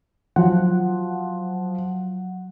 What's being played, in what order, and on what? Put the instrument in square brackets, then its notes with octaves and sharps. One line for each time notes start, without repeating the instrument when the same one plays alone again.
[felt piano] F3 [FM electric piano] F#3 F#5